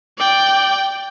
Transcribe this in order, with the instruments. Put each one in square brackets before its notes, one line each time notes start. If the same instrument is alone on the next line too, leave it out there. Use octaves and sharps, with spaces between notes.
[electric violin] D5 G5